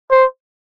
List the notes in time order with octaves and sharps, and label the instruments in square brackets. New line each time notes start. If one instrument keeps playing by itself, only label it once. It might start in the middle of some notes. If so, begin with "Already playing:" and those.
[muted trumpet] C5